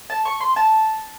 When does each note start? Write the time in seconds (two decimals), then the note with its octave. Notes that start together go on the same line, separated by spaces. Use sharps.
0.10 A5
0.25 C#6
0.40 C6
0.56 A5